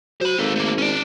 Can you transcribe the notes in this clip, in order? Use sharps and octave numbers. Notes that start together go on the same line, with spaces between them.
F#3 C5 B5
G#1 A#3 A4
A3 A#3
C#4 D5